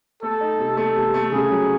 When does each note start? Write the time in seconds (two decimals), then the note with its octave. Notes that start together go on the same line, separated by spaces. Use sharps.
0.22 A3 A4
0.41 D#4
0.59 C3
0.77 A3 A4
0.96 C3
1.14 A3
1.32 C#3 G#4
1.51 F#3